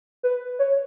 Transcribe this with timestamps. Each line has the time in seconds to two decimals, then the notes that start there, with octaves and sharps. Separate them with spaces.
0.23 B4
0.59 C#5